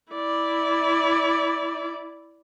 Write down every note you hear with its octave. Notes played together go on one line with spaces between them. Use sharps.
E4 D5